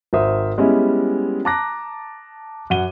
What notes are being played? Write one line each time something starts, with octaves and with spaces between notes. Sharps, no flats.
G#1 A#4 C5 E5 D#6
G3 G#3 B3 C#4 E4
A5 A#5 D6 F#6 A#6
F#2 F#5 D#7 G7